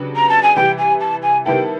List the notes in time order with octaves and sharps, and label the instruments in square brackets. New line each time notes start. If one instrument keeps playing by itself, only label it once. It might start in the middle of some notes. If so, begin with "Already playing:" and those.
Already playing: [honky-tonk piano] C#3 F#3 B3 D4 G4
[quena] A#5
A5
G#5
[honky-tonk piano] C3 E3 G3 [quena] G5
[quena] G#5
A5
G#5
[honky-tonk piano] D#3 G3 B3 E4 A4 [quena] G5